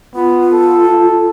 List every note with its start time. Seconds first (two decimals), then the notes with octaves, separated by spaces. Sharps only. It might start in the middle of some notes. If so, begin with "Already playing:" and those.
0.15 B3 F4
0.53 A4